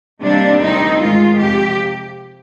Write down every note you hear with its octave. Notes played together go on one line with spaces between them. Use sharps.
C3 D#3 G3 A#3 D4
D2 C3 D#3 G3 C4 D#4
G#2 D#3 G#3 F4
F2 C3 G4